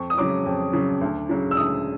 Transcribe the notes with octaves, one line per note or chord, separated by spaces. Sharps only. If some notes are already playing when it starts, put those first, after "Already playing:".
Already playing: F2 C#6
D#6
C#3 F#3 D6
F2
C#3 F#3
D2
C#3 F#3
E6
D2 D#6